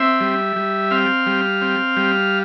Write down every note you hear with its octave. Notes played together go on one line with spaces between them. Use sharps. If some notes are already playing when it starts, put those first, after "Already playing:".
Already playing: C4 E5
G3
G3
C4 F5
G3
C4
G3